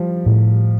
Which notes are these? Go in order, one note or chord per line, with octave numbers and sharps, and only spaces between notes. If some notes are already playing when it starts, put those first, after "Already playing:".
Already playing: F3 G3
A2